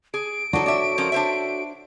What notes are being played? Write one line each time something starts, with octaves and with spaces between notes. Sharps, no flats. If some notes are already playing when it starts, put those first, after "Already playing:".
G#4 D7
D4 D#4 F#4 A4 C#5
D4 E5
F3 C#4 A#4
D4 C5 E5